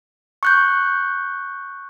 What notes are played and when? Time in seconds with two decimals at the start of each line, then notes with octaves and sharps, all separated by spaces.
0.43 C#6 F#6 G6